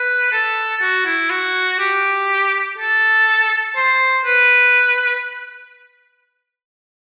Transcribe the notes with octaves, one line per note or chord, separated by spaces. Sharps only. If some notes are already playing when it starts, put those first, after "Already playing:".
Already playing: B4
A4
F#4
E4
F#4
G4
A4
C5
B4